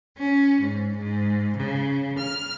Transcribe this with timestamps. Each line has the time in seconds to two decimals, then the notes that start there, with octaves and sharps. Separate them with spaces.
0.17 C#4
0.59 G#2
0.96 G#2
1.55 C#3
2.17 F6